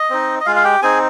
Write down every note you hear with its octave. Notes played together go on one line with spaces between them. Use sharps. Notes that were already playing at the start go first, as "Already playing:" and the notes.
Already playing: D#5
C4 D#4
D#5
G#3 F4 F5
F5
G4 G5
C4 D#4 G#4 G#5